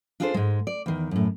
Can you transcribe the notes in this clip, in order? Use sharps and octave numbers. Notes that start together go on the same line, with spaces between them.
D4 F4 G#4 A4 B4 C5
G#2 G#3
D5
E2 D#3
F#2 A2